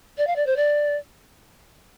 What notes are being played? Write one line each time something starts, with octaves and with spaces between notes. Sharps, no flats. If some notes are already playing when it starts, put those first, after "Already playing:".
D5
F5
D5
C5
D5